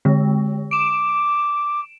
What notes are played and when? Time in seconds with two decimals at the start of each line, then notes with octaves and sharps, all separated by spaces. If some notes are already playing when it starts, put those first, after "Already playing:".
0.05 D3 G#3
0.71 D6 D7 E7